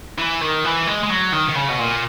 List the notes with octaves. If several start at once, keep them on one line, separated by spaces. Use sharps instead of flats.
E3
D#3
E3
G#3
G#3
F#3
D#3
D#3
C#3
B2
A#2